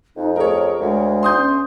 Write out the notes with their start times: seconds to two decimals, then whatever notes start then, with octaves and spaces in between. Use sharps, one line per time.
0.16 F2 D#4
0.36 G#4 A#4 C#5
0.80 D2 G#3
1.23 C6 D#6 G6
1.37 C#4